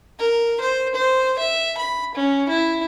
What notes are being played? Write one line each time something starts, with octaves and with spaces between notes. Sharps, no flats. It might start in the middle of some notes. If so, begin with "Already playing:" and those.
A#4
C5
C5
E5
B5
C#4
E4